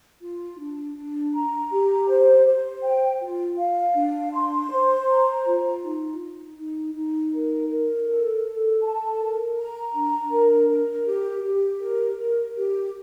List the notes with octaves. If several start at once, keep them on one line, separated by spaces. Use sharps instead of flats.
F4
D4
D4
A#5
G4
C5
C5
G5
F4
F5
D4
C6
C5
A#5
F4
D#4
D#4
D#4
D#4
A#4
A#4
A4
A4
A5
A#4
A#5
D4
A#4
A#4
G4
G4
A#4
A#4
G4